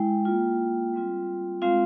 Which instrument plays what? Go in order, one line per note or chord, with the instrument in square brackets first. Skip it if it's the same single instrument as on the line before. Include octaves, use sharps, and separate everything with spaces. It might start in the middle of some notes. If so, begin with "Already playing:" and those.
Already playing: [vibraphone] G#3 E4 G5
A#3 F4
G3 C4 F4
G#3 C4 F4 F5